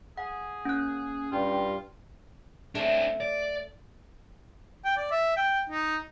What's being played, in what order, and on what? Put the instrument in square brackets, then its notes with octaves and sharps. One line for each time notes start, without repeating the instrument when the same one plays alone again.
[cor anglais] G#4 [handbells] F#5
[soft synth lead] A#3 [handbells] C#4 F#6
[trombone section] G2 [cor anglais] F4 [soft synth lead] G5
[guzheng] A3 [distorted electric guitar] C4 D4
[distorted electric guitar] D5
[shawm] G5
D5
E5
G5
D#4